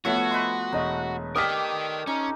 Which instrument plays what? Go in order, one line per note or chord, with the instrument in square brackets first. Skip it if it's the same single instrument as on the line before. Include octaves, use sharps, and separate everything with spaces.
[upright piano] F3 A3 B3 [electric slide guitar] F#4 [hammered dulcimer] C#5 E5
[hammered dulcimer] B4 D#5 C6
[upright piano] E1 D#5 [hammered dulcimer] A3
[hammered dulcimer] G4 A4 D5 [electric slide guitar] A#4 D#5 [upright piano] D#6 F6 B6
[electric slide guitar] C#4 [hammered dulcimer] D#4